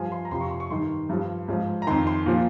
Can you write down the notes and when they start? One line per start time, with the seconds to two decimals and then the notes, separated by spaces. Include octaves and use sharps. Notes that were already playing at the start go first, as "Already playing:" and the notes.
Already playing: G2 F3 G#5
0.12 C6
0.25 A#5
0.31 F2 C3 F3 C6
0.41 C#6
0.51 C6
0.60 C#6
0.70 G2 D#3 C6
1.09 G2 F3
1.48 G#2 F3
1.82 A#5
1.87 F2 D#3 C6
2.07 C6
2.26 A#2 F3